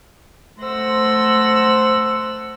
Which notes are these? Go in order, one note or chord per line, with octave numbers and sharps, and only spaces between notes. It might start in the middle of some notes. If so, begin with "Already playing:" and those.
A3 C5 F#5 C6 E6 A#6